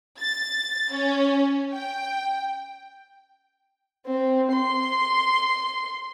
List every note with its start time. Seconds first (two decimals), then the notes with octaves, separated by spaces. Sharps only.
0.19 A6
0.93 C#4
1.73 G5
4.06 C4
4.52 C6